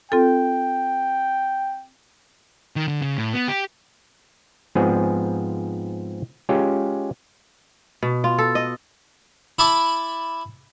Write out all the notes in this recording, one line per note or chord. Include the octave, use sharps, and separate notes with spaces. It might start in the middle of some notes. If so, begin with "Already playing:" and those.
C4 F4 A4 G5
D#3
D3
C#3
A2
B3
G4
G#2 F3 G#3 B3 C4 G#4
G#3 C#4 F4 G4
B2
F4
A4
D#5
E4 E5 A5 B5 D6